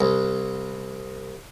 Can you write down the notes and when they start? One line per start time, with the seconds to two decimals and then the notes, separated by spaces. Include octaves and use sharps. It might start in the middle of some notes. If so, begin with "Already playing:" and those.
0.01 C2